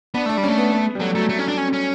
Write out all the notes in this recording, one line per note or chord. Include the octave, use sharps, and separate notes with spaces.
B3 D4
A3 D4
G3
A3 C#4
B3
B3
G3
F#3 A3
F#3 A3
A3
C#4
D4
C#4
C#4